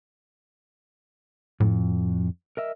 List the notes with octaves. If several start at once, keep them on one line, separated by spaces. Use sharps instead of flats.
F2 A2
A#4 D#5 E5